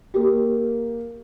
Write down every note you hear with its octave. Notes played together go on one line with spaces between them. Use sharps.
A#3 G4